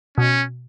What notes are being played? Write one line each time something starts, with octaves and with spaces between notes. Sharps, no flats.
B2 C#4